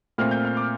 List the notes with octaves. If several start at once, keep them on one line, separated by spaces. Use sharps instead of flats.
A#2 A3 C4 F6
G6
F6
D6